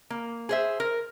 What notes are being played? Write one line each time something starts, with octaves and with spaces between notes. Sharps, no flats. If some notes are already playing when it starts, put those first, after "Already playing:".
A#3
G#4 C5 E5
A#4